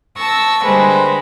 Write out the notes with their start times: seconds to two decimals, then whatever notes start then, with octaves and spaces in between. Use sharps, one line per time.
0.17 A5 C#6 E6 A#6
0.64 D3 G3 G#3 A#3 B4 C5